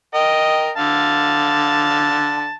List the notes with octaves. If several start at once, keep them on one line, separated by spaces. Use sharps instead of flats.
A#4 D#5 G5
D3 F5 A5